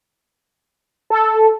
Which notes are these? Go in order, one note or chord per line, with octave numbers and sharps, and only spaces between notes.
A4